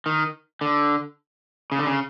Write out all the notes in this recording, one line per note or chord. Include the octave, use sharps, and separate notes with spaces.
D#3
D3
C#3
D3
C#3